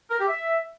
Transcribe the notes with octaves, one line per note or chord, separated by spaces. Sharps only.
A#4
G4
E5